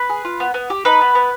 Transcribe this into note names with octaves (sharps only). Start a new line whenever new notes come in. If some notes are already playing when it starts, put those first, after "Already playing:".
Already playing: B4 B5
G#4
F4
B3
B3
G4
D#4 B4 B5
B3
B3